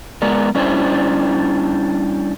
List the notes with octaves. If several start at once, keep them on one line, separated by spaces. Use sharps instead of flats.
G#3 B3 A#4 D5
G3 C#4 D4 E4 C5